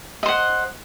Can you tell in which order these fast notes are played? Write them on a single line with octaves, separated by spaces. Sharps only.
D#5 C5 F#5